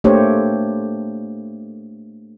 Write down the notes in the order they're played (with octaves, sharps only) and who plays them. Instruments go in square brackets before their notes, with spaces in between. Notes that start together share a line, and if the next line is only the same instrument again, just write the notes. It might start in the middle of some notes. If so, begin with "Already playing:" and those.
[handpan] A3 A#3 D4 G4 C5 C#5